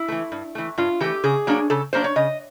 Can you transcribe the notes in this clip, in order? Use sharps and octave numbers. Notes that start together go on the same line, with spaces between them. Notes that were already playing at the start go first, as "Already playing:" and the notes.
Already playing: E4
E3 A3
G2
E3 A3
G2 F4
E3 A3 G4
C#3 G#4
F#3 A#3 D4
C#3 A4
F#3 A#3 D4 C5
C#5
C#3 D#5